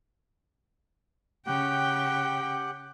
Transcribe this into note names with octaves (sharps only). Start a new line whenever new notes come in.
C#3 G4 F#5 G5